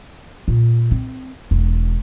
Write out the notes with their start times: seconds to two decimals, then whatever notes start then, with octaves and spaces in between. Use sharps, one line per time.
0.48 A#2
0.91 C4
1.51 E1